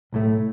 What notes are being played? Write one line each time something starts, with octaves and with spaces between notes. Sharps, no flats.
B1 A2 A3